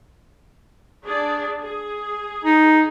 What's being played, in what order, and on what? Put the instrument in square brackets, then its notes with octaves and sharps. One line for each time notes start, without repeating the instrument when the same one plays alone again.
[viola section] D4 G#4 D5
G#4
[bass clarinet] D#4